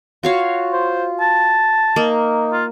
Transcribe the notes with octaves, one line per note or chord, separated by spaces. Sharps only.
F4 F#4 C#5 F5
C5
A5
A#3 D#4
F4